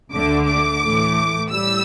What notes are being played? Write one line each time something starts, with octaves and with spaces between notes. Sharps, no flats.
D2 D3 A3 D6
D6
A2 E3 A3
A2 G3 E6